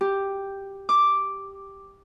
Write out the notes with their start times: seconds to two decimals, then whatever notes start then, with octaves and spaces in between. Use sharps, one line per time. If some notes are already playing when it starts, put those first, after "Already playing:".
0.01 G4
0.89 D6